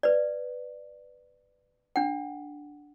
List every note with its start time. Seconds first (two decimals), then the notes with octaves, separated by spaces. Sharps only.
0.03 B4 D5
1.96 D4 F#5